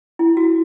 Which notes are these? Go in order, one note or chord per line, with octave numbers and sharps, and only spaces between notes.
E4
F#4